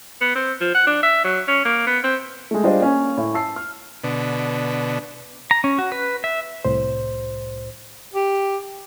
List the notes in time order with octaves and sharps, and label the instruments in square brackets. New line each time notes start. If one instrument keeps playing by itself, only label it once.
[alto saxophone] B3
C4
F3
F#5
D4
E5
F#3
C#4
A#3
B3
C4
[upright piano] G#3 A3
G3 D4 F4 G#4 C5 D#5
A#3 C#4 G#5
A2
A5 E6 C7
F6
[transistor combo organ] B2 D3
[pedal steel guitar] A#5
C#4
F#4
B4
E5
[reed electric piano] C2 A2 C5
[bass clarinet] G4